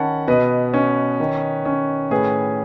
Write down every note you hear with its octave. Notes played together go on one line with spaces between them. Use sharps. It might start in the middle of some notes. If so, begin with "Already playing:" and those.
Already playing: D#3 C#4 F#5 A5 B5
B2 B4 D#5
C#4
D#3
C#4
A2 G#4 B4